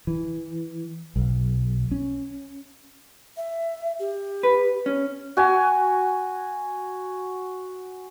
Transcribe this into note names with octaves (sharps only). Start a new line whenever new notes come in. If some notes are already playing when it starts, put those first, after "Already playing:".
E3
B1
C#4
E5
G4
B4
C#4
F#4 G#5